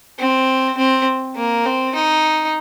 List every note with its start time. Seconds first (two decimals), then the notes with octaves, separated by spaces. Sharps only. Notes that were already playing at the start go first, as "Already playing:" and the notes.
0.19 C4
0.77 C4
1.36 A#3
1.65 C4
1.95 D#4